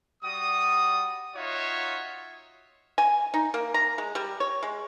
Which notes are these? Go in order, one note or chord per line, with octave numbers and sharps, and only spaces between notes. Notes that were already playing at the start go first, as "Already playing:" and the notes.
G3 F#4 D#6
D#4 F4 F#4 C#5 E5
G#5
D#4
A#3
A#5
G#3
G3
C#5
G#3